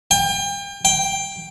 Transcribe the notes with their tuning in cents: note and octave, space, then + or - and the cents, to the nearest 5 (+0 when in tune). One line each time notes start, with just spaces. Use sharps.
G5 +35
G5 +10